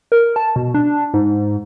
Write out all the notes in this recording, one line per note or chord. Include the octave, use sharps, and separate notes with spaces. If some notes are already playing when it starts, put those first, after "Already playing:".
A#4
A5
B2
D4
G#2